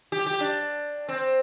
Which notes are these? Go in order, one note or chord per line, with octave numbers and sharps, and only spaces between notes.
G4
G4
D4
C4